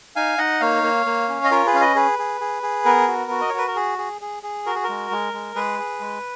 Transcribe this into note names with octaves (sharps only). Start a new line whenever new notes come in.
D#4 F5 G#5
D#4 D#5 F#5
A#3 C#5 F5
A#3
A#3
C#4
D#5
F4 A#4 C#5
G#4 B4
C#4 F5
B4 D#5
G#4 B4
G#4
G#4
G#4
B3 A#4
F#4
F#4
D#5
C#5
F#4 B4
A#4
G#4
G#4
G#4
G#4
F#4 A#4
G#4
A#4
G#3
G#3
G#3
G#3 G#4 B4
G#4
G#3